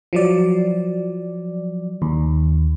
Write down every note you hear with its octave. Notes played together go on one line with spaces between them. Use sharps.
F3 F#3 D5
D#2